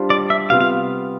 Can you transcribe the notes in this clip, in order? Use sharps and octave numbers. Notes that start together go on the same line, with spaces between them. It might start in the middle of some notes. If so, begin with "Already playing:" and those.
Already playing: G3 D4 F4 C5
D5
E5
C3 G3 B3 F4 F5
F5